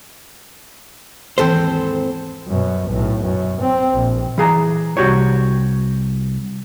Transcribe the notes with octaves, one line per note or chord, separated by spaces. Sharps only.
D#2 G#2 E3 C4 A4 C5
F#2 B2
B1 A2
F#2
C4
A#1
E3 G#4 A#5
C2 A#2 F#4 G4 C#5